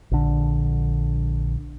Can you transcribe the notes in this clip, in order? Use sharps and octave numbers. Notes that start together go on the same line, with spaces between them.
A#1 D3